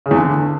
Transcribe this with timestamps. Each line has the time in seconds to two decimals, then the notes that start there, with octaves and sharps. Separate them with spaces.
0.06 C#3
0.11 E2
0.16 D3